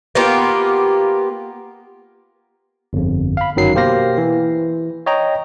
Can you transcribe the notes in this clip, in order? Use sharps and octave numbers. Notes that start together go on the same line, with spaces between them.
A#3 B3 F4 G4
G1 F2
F5 B5
G1 F#2 D#3 F#3 C7
B2 A#3 G4 C5 F5 A#6
E3
C#5 D#5 G5 A#5